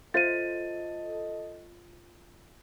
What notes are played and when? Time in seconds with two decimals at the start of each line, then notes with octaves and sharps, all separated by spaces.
0.14 F4 A4 C5 D#5 E5 A6 D#7